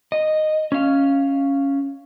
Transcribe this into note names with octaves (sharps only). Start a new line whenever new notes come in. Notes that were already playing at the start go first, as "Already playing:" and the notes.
D#5
C#4 F5